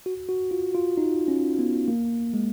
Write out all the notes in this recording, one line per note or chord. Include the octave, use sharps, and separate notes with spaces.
F#4
F#4
F4
F4
D#4
C#4
B3
A#3
G#3